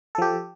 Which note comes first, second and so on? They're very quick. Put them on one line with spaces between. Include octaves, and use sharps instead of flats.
A4 F3 G4